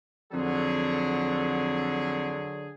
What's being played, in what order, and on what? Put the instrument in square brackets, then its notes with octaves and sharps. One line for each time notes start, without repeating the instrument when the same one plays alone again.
[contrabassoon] F2 [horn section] D3 F#3 G#4